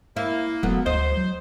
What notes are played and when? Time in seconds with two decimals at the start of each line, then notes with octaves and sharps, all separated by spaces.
0.16 A#3 E4
0.63 E1 F#3 A3 B3
0.86 D2 C5 D#5
1.17 F#3